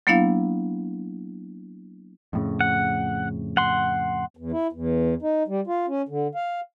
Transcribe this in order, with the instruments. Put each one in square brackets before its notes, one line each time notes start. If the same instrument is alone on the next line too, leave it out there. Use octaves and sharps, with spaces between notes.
[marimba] F#3 A#3 B3 D4 E4 F5
[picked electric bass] F2 A2 C#3
[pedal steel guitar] F#5
F#5 C6
[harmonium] E2
E4
E2
D#4
G3
F4
C#4
D3
F5